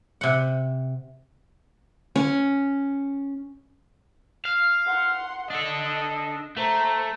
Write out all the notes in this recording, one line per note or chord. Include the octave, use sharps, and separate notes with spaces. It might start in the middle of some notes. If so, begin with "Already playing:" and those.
C3 F#5
C#4
F5
F#5 C6
D4 A4 D#5
A3 C5 A#5